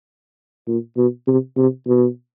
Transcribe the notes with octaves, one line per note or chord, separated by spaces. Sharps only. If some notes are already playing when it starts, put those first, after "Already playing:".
A#2
B2
C3
C3
B2